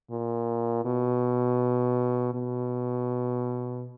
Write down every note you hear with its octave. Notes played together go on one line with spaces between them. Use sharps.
A#2
B2
B2